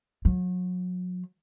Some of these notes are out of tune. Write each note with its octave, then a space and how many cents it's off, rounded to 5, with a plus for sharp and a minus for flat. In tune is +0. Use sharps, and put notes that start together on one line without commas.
F#3 -35